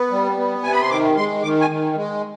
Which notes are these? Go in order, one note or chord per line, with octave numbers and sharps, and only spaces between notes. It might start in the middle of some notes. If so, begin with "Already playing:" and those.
Already playing: B3
G3
B3
C3 G#5
B5
C6
D#3 D6
G#3 C6
D#3 D6
G#5
D#3
G#3